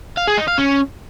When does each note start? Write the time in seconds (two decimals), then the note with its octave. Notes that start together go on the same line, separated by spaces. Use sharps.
0.17 F5
0.27 G#4
0.37 D#4
0.48 F5
0.58 C#4